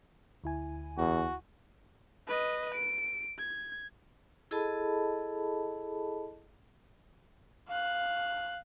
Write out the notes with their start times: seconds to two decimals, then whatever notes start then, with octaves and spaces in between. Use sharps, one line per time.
0.44 D2 E4 G#5
0.97 E2 F#4
2.27 B4 D#5
2.75 D7
3.39 G#6
4.51 E4 G#4 A4 D#5 A5 B5
7.68 F5 F#6